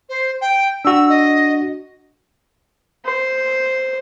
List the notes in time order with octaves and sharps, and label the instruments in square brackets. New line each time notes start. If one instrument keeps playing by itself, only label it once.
[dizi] C5
G5
[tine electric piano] D4 F#4 [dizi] E6
[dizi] D#5
[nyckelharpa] C5